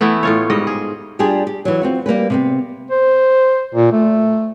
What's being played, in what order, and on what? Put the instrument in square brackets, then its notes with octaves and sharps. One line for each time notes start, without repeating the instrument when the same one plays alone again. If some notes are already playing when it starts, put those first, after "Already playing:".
[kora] E3 A3 B3 E4
A2 F4 C#5
G#2 G3 D#5
G#4
[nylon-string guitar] G3 D4 F4 G4 G#4
G4
E3 F#3
C4 F4 F#4
G3 A#3 C#4 B4
C3 B3 C4
[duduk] C5
A#2
A3